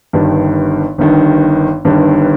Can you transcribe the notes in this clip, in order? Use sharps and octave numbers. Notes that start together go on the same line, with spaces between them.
G1 G2 D#3
G1 G2 D#3
G1 G2 D#3